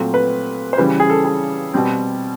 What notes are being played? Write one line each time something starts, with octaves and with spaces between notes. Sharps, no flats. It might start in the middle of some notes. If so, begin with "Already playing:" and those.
Already playing: A#2 F#3 A3 C4
B4
C5
C#3 E3 G3 B4
G#4
A4
G#4
B2 G3 C4